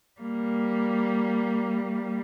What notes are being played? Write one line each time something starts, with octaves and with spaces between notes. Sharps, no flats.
G3 A#3